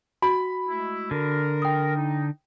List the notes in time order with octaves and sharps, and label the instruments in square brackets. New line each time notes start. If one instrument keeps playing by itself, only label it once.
[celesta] F#4 [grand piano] B5
[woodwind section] G#3 A3 E4
[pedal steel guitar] D3 [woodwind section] A#4
[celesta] G5 D#6
[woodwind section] D#4